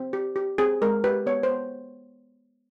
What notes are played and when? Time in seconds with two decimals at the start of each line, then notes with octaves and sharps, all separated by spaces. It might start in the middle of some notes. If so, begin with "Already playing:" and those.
Already playing: C4
0.13 G4
0.36 G4
0.58 C4 G#4
0.82 G#3 A#4
1.04 G4 B4
1.26 B3 C#5
1.43 C5
1.49 B3